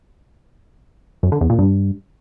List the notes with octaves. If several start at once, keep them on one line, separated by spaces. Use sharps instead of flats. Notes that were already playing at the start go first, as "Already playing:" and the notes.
F#2
D3
E2
A#2
G2